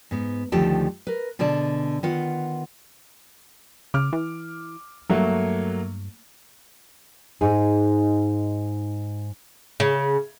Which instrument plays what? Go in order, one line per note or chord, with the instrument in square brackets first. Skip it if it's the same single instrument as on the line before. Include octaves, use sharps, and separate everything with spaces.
[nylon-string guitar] G#2 B3
D2 D#3 F3 G4 A4 A5
A#4 B4
B2 D3 G#4 D5 A5
D#3 B3 F4 B4 F#5
[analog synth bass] C#3 [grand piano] D6 F6
[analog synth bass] E3
[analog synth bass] G2 [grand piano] F#3 A3 A#3
[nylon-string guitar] G#2 D#4 G#4
[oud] C#3